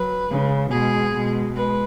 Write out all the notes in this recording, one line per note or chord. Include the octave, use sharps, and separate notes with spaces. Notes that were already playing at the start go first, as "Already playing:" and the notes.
Already playing: F#3 B4
C#3 G#3
B2 G#3 G#4
B2 G#3
G#3 B4